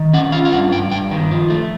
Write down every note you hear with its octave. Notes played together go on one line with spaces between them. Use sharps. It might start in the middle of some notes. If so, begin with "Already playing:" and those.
Already playing: D#3
C#4 F#5
F4 F5
F5
G2 F#5
G2 G5
G2 G5
D#3
F3
A3